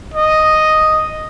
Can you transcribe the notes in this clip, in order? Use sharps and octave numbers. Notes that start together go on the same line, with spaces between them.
D#5